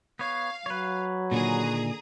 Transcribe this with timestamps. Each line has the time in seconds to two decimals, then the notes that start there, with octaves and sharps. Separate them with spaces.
0.19 B3 C#5 F5
0.66 F#3 B4 C#5
1.32 A#2 D3 D#3 G#4 A#5 D#6